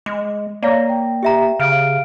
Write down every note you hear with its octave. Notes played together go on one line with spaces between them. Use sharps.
G#3 D6
A#3 C#5 D5 F5 A#5 A#6
G5
G4 E5 A#5
C#3 F5 F6 D7